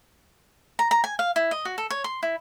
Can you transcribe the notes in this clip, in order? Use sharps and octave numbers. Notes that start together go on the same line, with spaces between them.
A#5
A#5
G#5
F5
E4
D#5
F#4
A4
C#5
C6
E4